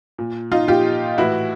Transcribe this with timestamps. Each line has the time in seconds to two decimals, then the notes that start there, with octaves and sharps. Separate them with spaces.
0.18 A#2
0.52 D#4 F4
0.68 A#2 F4 G4
1.18 A2 E3 E4 F#4